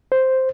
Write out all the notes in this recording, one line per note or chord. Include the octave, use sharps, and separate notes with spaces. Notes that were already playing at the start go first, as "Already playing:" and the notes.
C5